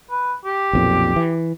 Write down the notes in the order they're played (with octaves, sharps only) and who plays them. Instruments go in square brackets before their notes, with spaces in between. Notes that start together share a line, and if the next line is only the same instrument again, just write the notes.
[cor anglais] B4
G4
[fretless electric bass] B1 F2 A#2
E3